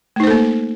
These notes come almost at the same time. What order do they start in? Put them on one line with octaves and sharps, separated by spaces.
A3 D#4 C5 A4 A#3